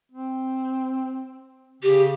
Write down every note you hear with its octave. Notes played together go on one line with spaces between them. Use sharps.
C4
C#3 G4